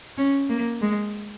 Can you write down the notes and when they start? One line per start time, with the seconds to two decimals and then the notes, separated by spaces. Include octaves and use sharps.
0.18 C#4
0.50 A#3
0.82 G#3